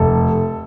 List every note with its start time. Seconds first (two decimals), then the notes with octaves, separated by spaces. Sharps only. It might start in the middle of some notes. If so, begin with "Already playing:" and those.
Already playing: F1 A4